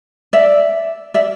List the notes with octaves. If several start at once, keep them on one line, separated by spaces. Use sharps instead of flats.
D5 E5
D5 E5